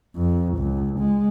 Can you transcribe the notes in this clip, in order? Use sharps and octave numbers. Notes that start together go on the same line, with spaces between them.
F2
C#2
G#3